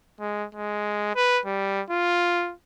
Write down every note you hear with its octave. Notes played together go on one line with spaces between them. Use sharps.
G#3
G#3
B4
G3
F4